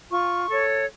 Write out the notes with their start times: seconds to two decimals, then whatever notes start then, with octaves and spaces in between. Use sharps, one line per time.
0.10 F4 C#6
0.48 A4 C#5